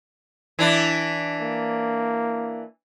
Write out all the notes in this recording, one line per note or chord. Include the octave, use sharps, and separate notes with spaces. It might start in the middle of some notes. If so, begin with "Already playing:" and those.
E3 D4
A#3